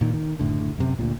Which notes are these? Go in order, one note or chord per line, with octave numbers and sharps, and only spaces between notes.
A#2 D#3
D#3
F#1 A2 D3
F#2 C3
D2 A#2